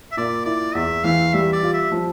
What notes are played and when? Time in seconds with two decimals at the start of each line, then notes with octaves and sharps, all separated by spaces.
0.12 E5
0.17 A#2 D5
0.45 E4 D5
0.75 E2 E5
1.04 E3 F5
1.33 G3 E5
1.53 D5
1.63 F4
1.73 E5
1.92 F3